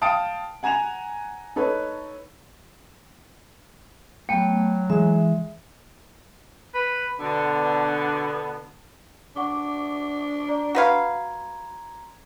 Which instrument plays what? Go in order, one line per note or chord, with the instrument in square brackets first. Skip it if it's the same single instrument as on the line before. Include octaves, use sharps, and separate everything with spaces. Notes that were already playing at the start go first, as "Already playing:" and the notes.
[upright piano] F5 G5 A5 D#6 D7
F#5 G#5 A#5 G#6 E7 F7
D#4 A4 B4 C#5
[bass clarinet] F#3 [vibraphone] A3 B3 [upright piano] G5
[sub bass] E3 [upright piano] G#3 [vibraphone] E5
[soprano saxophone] B4
[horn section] B2 D3 [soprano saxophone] B3 [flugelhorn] D4
[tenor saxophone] D4 [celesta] F#5 C#6 D6
[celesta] D5 A#5
[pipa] F#4 B4 F5 [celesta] A#5 C6 G#6